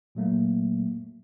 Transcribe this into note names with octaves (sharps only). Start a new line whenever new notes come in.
A#2 F#3 A3 A#3